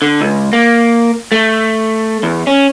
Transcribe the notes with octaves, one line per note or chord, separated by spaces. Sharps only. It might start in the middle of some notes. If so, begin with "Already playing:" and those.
D3
C#2
A#3
A3
E2
C#4